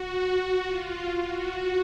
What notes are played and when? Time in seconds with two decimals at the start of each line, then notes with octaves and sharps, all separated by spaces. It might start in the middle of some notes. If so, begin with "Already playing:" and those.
Already playing: F#4
0.35 F#4
0.64 F4
1.22 F#4